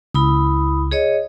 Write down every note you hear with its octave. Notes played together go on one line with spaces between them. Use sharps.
C#2 E4 B5 D#6
G#4 C#5 D#5